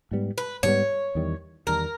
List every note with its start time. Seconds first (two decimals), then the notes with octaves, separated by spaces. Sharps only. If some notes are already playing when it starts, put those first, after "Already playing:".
0.11 G#2 G3 B3
0.38 B4
0.63 G#2 G3 B3 C#5
1.15 E2 D#3 G3
1.67 E2 D#3 G3 A#4